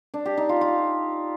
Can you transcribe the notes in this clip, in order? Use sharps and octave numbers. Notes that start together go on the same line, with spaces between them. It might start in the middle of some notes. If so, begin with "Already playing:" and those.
D4
G4
D#4
F4
F4